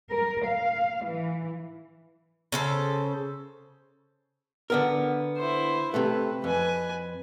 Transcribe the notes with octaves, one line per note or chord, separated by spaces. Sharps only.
A#4
F5
E3
C#3 A4 C5
D3 B3 A#4
E4 C5
C3 A3 B4
F2 B4 G#5